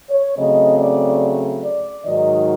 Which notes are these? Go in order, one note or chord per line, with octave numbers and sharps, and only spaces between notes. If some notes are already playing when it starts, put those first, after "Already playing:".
C#5
C#3 F#3 A3 C4 D#5
D5
D5
G#2 D#3 F#3 D#5